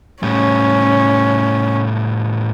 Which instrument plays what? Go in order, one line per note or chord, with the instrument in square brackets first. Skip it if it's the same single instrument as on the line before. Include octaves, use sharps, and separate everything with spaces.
[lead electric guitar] A2 G3 [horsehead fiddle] C#4